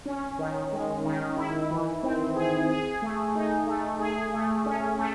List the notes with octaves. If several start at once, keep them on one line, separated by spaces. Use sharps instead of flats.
C#4
D#3
G#3
D#3
E4
E3
C4
G#4
G#4
A3
D#4
A3
G#4
A3
C#4
A3